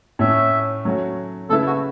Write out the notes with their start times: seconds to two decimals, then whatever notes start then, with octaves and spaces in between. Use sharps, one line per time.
0.19 A2 A3 C#4 E5
0.85 F#3 A3 C#4 F#4
1.49 C#3 A3 E4 A4 B4 E5
1.67 F#4